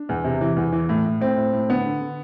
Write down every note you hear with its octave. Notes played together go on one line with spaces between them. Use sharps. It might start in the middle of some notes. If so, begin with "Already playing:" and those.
Already playing: D4
E2
C3
E3
E2
E3
A2
A2
A2 C4
A2
A2
D3 B3
D3
D3